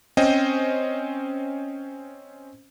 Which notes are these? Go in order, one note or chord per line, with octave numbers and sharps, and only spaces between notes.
C4 C#4 C5 D#5 G5